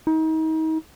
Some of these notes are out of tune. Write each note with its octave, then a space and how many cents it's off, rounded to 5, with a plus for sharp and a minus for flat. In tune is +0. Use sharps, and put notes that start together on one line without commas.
D#4 +35